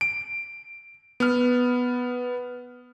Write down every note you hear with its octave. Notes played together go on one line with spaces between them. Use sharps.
D7
B3 F6